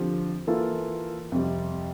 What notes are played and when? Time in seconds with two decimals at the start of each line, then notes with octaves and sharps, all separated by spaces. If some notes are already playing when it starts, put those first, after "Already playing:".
Already playing: D3 F3 C4 G4 C5
0.47 E3 A#3 F4 A4
1.32 F2 C3 G3